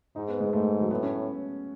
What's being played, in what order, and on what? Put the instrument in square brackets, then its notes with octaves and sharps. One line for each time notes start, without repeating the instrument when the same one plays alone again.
[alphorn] G#2 [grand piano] D#4
[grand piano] B3
G#3
[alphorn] G#2 [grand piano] A3
[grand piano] F#3
[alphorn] A2 [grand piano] B3
[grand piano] C#4